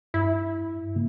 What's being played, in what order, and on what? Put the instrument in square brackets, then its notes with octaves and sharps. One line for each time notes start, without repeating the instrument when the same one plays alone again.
[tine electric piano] G2 [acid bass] E4
[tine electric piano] G#2 C#3 A#3